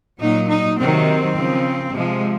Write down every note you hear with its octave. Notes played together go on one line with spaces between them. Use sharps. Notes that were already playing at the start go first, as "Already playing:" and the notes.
A#2 F#3 D#4
D#4
C3 D#3 F#3 C4
C#3 F3
C3 F3 G#3